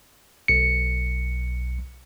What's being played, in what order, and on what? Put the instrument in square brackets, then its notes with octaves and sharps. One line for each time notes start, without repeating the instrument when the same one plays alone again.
[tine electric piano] B1 C#7